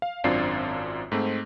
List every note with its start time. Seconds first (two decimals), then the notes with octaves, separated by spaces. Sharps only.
0.02 F5
0.24 G#1 F#2 C4 D4 F4 C7
1.12 G#2 A3 C4